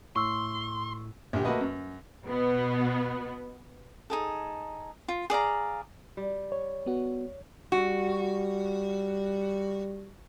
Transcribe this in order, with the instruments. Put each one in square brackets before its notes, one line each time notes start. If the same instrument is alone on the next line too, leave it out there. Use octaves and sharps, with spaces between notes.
[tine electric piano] A2 [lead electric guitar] C6 [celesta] C#6 E6
[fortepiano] A#1 D3 G4
A3 A#3 F#4 B4 D#5
F#2
[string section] B2 B3
[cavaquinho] D#4 G#4 A4
F4
G#4 D5 F5 A#5
[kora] G3
[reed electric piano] C#5
[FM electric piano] B3 F#4
[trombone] G3 [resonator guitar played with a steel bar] F#4